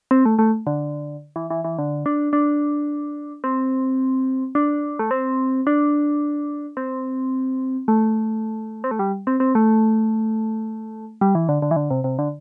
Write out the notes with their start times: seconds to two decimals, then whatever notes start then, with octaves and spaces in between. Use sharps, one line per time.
0.11 C4
0.26 A3
0.39 A3
0.67 D3
1.36 E3
1.50 E3
1.64 E3
1.79 D3
2.06 D4
2.33 D4
3.44 C4
4.55 D4
4.99 A3
5.11 C4
5.67 D4
6.77 C4
7.88 A3
8.84 C4
8.91 A3
8.99 G3
9.27 C4
9.40 C4
9.55 A3
11.21 G3
11.35 E3
11.49 D3
11.62 D3
11.71 E3
11.76 D3
11.91 C3
12.04 C3
12.19 D3